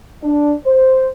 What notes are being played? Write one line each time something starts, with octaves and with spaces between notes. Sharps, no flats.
D4
C5